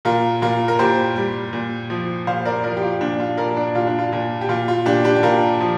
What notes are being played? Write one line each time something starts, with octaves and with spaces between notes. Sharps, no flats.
A#2 F4 A#4
A#2 F4 A#4
A#4
A#2 G4 C5
G3
A#2
F3
A#2 C5 F5
A#4 D5
F3 A#4 D5
G4
F4
A#2 D4
F4
A#2 A#4 D5
D4
A#2 F4
D4
F4
A#2
G4
A#2 F4
F4
A#2 D4 G4
D4 G4
G4
A#2 F4 A#4
F3